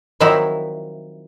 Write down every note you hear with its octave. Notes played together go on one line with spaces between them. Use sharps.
D#3 F3 F#3 C4 D#4 E4